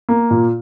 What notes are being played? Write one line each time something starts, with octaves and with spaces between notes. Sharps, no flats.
A#3
A#2